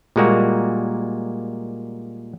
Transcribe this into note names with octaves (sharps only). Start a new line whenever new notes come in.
A#2 G3 G#3 A#3 F#4